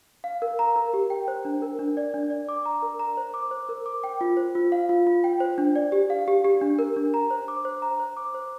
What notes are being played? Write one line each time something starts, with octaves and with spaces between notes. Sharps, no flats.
F5
A#4
A#5
A#4
G4
G5
C5
D4
A#4
D4
D5
D4
D5
D6
A#5
A#4
A#5
C5
D6
C5
A#4
D6
G5
F4
C5
F4
F5
F4
F4
G5
C5
D4
D5
G4
F5
G4
G4
D4
A#4
D4
A#5
C5
D6
C5
A#5
C5
D6
C5